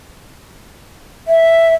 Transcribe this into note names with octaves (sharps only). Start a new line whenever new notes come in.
E5